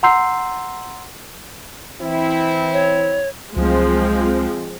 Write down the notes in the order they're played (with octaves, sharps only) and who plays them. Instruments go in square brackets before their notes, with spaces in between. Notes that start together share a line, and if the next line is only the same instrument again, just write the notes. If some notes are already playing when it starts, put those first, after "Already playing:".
[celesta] F#5 A#5 C6 E6 G6 C7
[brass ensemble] E3 C4 E4
[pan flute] C#5
[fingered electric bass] C#2 F#3 A3 [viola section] F3 G#3 C4